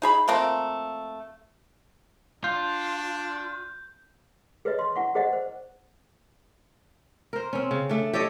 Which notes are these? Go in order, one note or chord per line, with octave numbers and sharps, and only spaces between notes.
D#4 G#4 B5
F3 A3 A#3 C4
D4 F4 G6
G#4 B4 C#5 D#5
C6
E4 F#5 C#6
G#4 C5 D5 D#5 F#5
C5
A#4 C5
C4 C#4
C#3
A3 D4
G4 A4 C#5 D#5